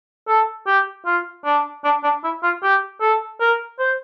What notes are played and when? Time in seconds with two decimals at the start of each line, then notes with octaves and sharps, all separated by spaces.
0.28 A4
0.67 G4
1.06 F4
1.45 D4
1.85 D4
2.04 D4
2.24 E4
2.43 F4
2.63 G4
3.01 A4
3.41 A#4
3.79 C5